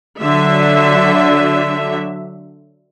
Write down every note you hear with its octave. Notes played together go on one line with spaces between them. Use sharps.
D3 F#3 E5